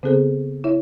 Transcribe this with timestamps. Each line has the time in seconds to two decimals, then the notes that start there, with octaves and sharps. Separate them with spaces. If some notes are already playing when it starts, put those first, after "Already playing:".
0.03 C#3 B3 C4 G#4 A4 C5
0.64 E4 C#5 E5